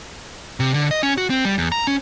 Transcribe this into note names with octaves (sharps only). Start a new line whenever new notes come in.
C3
D3
D#5
C#4
F#4
C4
G3
E2
A#5
C#4